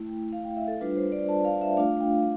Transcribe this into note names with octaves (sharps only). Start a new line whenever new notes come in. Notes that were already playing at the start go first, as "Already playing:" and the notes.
Already playing: A3 E4 G5
F5
G5
E5
A4
G3 D4 F4 B4
C5
D5
A5
F5
E5
A3 D4 F4 F5
G5